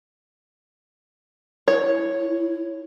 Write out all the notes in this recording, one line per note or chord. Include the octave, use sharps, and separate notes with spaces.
E4 C#5